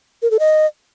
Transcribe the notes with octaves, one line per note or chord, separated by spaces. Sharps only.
A#4
A4
D#5